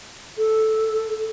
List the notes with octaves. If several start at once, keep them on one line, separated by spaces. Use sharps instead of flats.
A4